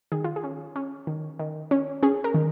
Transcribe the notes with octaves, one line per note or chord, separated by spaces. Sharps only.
D#3 G#4
F4
G#4
C#4
C#4
D#3
D#3
C#4
C#4 G#4
A#4
D#3